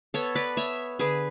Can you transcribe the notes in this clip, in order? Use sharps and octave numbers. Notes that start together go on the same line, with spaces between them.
B3 A4 C#5
B4 D5
B3 C#5 E5
D3 G#4 B4